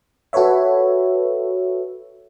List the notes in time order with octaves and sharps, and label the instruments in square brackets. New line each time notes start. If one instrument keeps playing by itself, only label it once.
[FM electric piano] F#4 A4 B4 C#5 E5